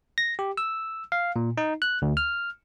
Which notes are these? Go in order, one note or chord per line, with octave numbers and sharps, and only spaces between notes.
A#6
G4
E6
F5
A#2
D#4
F#6
D2
F6